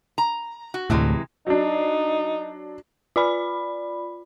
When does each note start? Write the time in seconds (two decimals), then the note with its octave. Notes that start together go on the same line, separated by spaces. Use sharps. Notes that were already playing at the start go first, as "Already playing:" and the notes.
0.18 A#5
0.74 F#4
0.90 D2 A2 C3 E3 G#3
1.47 F#3 D4 D#4
3.16 F4 D5 B5